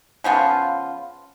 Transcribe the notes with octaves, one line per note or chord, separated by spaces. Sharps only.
C#3 F3 B3 F4